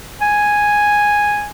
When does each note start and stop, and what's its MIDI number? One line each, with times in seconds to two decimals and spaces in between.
0.21 1.50 80